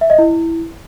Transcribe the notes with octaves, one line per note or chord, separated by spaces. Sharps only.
E5
D#5
E4